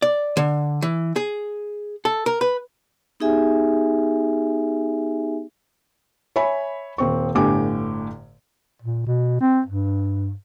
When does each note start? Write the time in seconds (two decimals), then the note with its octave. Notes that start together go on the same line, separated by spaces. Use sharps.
0.02 D5
0.37 D3
0.82 E3
1.16 G#4
2.05 A4
2.26 A#4
2.41 B4
3.20 B3 D#4 G4 G#4 E5 G#5
6.36 C#5 E5 G#5 B5
6.98 D#1 C4 C#6
7.35 G1 A2 D3 G4 G#5 D6
8.82 A#2
9.07 B2
9.41 C4
9.66 G2